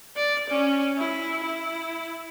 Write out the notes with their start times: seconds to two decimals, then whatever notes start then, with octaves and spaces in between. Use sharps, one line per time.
0.16 D5
0.50 C#4
0.97 E4
1.44 E4